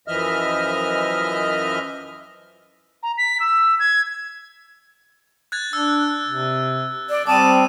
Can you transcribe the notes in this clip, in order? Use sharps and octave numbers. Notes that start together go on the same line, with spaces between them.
F#2 E3 F3 D#5 E5 F6
A#5
B6
E6
G#6
F#6 G#6 A6
D4 E6
C3
D5
G3 C4 A5 D6 D#6 D#7